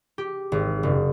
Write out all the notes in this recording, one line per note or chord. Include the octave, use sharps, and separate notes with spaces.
G4
G#1
F#1